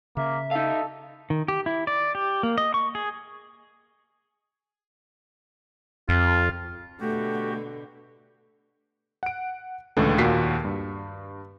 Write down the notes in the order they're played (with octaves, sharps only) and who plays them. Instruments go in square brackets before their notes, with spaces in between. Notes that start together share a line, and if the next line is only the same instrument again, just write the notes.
[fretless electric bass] C#3 [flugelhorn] A#3 [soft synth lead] E5
[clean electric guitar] D#4 F5 [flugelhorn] A4
[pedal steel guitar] D#3
G4
E4
D5
G4
A#3
D#5
C#6
G#4
[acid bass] F2 [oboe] F4
[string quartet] B2 D3 [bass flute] A3 [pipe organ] F#4 G4
[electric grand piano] F#5 D7
C#2 A2 D3 E3 A3
D#2 A#2 F4 F#4 B6 C7
G2